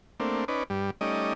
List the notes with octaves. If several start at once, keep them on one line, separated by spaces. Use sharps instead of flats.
A3 A#3 C4 D4
C#4 D#4 B4 D5
G2 G3
G3 A3 C#4 D#4 D5 D#5